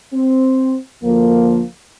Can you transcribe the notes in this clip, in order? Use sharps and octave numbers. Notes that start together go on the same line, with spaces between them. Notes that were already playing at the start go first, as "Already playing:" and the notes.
C4
D2 F3 A#3